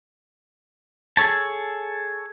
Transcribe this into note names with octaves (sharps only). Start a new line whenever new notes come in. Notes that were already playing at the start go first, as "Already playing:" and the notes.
G#4 A4 C#5 A5